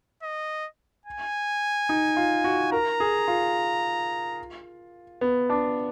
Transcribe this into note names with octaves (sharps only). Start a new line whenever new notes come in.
D#5
G#5
D#4
F4
F#4
A#4 A#5
G#4
F4
B3
D4